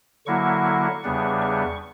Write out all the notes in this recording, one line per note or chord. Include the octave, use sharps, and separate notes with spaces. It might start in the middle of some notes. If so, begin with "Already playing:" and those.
D3 F#3 A#3 E4 C#6
E2 C#3 G3 B3 D4
C#6